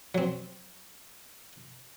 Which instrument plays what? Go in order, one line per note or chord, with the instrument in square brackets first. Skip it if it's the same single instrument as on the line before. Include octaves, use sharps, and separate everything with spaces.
[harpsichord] F#3 C4